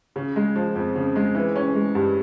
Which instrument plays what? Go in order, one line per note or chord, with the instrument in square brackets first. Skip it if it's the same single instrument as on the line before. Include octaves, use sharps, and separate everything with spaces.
[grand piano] C#3
G#3
F3
F2
C#3
G#3
E3
C#4
G#3
G2